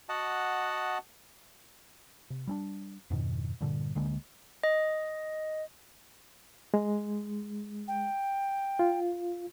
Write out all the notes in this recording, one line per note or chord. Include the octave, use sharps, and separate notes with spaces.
F#4 D#5 F#5 A5
C3
G3 C#4 D4
F2 G#2 B2 D#3
G2 A#2 D3
D2 D3 G#3 A#3
D#5
G#3
G5
F4